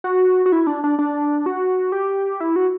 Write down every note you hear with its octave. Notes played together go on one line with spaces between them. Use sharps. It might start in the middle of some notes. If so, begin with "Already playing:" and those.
F#4
F#4
E4
D4
D4
D4
F#4
G4
E4
F#4